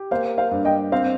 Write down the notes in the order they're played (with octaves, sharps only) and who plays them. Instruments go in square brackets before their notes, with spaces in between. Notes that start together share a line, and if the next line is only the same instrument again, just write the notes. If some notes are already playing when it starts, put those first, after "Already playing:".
Already playing: [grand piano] G4
[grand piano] A#3 [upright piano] C5 F5
[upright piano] C5 F5
[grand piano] G2
[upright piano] D#5 G5
[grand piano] C4 [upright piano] C5 F5